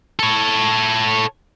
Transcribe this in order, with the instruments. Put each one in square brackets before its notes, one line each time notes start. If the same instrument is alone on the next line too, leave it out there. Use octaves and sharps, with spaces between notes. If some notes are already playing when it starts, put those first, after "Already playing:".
[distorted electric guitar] A4 C#5